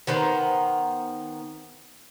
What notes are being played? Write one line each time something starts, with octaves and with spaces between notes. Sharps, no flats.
D#3 B3 C5 A#5